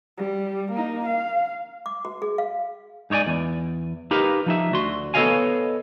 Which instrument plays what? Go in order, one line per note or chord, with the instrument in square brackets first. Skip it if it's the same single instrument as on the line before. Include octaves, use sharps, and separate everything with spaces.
[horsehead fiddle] G3
A#3 D#4
F5
[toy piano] D6
F#4
G#4
F5
[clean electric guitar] G#2 D#4 C#5 D5 G#5
E2
D#4 G4 A#4 B4 F5
F3 D#4 E5
D2 F#4 C6
B3 A4 C#5 D#5 F5 G#5